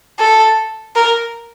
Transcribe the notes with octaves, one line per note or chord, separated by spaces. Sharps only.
A4
A#4